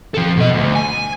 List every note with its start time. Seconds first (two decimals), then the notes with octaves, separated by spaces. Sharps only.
0.14 F3 A4
0.37 B2 D#5
0.53 D2
0.75 G#5